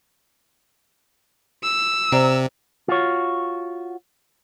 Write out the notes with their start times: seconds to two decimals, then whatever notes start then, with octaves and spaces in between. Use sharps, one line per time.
1.64 E6
2.12 C3 C5 D5 A#5
2.88 F4 F#4 C#5